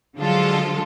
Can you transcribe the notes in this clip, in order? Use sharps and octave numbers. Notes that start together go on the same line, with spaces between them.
D3 F3 F#3 G#3 F4 A4